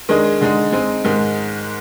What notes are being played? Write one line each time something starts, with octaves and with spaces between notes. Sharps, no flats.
D#3 G#3 D4 G#4 D#5
D3 G#3 D#4
G#3 C4 D#4
G#2 D#3 G#3 D#4